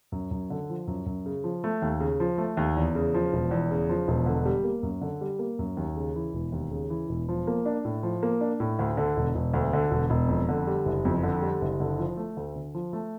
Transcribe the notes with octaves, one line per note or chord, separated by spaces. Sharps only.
F#2
F#2
D3
F3
F#2
F#2
C#3
F3
A3
D#2
C#3
F3
A3
D#2
E2
C#3
F3
E1
E2
C#3
F3
E1
D3
G3
A#3
F#2
D3
G3
A#3
F#2
D#2
C#3
E3
E1
D#2
C#3
E3
E1
F3
A#3
D4
A2
F3
A#3
D4
A2
D2
D3
E1
E1
D2
D3
E1
E1
F2
D3
G3
F#1
F2
D3
G3
F#1
D3
F3
A3
D2
D3
F3
A3